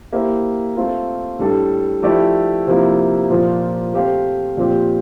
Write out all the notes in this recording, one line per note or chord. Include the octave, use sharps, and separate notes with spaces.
A#3 E4 G4 C5 E5
A3 C4 F4
A2 G3 D4 A4
F3 A3 E4 G4 D5
C3 F3 A#3 E4
A#2 F3 A#3
A3 C4 G4 C5 F5
A#2 F3 C4 G4